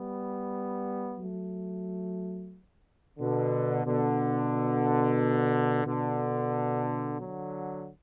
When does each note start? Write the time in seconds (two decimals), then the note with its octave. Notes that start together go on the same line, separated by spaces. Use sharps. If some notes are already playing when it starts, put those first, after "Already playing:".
Already playing: G3 B3
1.19 F#3 A3
3.19 B2 D3
3.86 B2 D3
5.87 B2 D3
7.20 D3 F#3